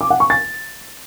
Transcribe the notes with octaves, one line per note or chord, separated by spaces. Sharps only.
D6
F#5
C#6
A6